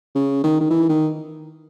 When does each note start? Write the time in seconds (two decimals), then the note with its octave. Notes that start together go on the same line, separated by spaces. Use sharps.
0.15 C#3
0.43 D#3
0.60 D#3
0.70 E3
0.89 D#3